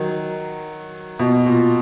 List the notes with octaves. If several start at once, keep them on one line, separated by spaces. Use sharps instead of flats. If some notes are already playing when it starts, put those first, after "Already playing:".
Already playing: D#3 F#3
B2
A#2